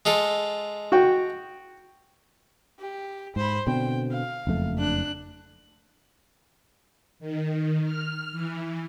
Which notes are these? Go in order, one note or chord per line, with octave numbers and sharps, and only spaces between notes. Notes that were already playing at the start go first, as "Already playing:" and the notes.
G#3 F4 A4
F#4 G5
G4
G#2 C5 B5
B2 D3 C4 G5
F5
F#1 F2 A3
D4 F#6
D#3
F6
E3